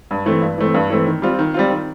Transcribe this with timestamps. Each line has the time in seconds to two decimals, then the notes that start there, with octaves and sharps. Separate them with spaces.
0.11 G2
0.26 E3 A3 C4
0.42 G2
0.58 E3 A3 C4
0.74 G2
0.90 E3 A3 C4
1.06 D#3
1.22 G3 C4 F4
1.39 D#3
1.54 G3 C4 F4
1.70 D#3